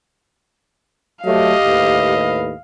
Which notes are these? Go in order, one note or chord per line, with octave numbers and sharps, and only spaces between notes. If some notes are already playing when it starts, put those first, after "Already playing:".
F#3 A3 G4 D#5 F5
D#2 A2 B4